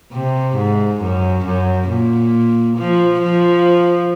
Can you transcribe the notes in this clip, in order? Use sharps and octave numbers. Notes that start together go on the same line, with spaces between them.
C3
G#2
F#2
F#2
A#2
F3
F3